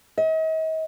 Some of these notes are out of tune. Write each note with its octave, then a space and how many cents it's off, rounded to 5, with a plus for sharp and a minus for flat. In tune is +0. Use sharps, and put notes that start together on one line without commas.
D#5 +40